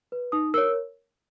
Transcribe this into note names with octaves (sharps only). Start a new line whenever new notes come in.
B4
D#4 D#6
A#4 C#5 E6